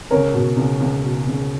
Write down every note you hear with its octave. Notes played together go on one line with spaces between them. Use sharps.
C#2 A#4 C#5
B2
C#2
C#2
B2
C#2